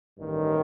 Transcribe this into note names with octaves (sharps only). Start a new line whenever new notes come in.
A1 G2 D#3